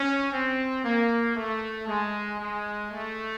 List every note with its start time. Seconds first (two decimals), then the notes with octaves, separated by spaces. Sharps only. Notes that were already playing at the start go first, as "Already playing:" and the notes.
Already playing: C#4
0.32 C4
0.84 A#3
1.36 A3
1.87 G#3
2.39 G#3
2.91 A3